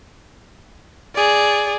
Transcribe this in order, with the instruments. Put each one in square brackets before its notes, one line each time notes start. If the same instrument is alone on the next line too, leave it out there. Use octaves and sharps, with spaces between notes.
[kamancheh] G#4 D5